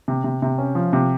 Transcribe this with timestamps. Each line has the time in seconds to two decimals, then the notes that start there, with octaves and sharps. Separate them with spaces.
0.08 C3
0.24 C3
0.42 C3
0.58 C#4
0.75 F3
0.93 C3